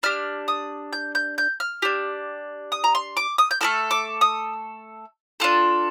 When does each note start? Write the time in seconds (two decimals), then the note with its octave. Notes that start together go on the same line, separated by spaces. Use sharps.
0.03 D4 G4 F6
0.48 D#6
0.93 G6
1.15 G6
1.38 G6
1.60 F6
1.82 D4 G4
2.72 D#6
2.84 A#5
2.95 C6
3.17 D6
3.38 D#6
3.51 G6
3.61 A3 D#4 A4 F6
3.91 D6
4.21 D#6
5.40 D4 F4 A4